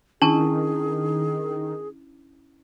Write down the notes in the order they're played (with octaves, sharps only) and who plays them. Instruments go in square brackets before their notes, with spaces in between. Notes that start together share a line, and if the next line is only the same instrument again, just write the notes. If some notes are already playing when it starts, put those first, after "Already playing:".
[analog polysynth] D#3 [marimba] C#4 E4 [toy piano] D4 A5 [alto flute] G#4